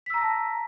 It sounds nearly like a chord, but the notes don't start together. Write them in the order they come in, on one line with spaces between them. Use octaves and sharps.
B6 E6 A#5 A#6 A5